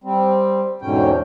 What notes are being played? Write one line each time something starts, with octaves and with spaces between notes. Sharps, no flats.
G3 C4
E2 G#2 B2 D3 C#4 G5